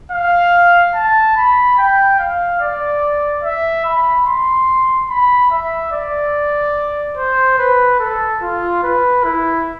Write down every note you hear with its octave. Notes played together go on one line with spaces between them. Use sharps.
F5
A5
B5
G5
F5
D5
E5
B5
C6
B5
E5
D5
C5
B4
A4
F4
B4
E4